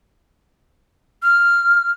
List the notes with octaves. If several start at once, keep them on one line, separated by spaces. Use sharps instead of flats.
F6